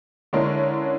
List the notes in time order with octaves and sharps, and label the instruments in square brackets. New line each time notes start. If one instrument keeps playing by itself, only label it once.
[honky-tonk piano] D3 G#3 C#4 D4 E4 A#4